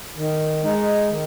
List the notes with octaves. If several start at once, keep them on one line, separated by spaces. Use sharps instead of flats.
D#3
G#3 D#4
D#3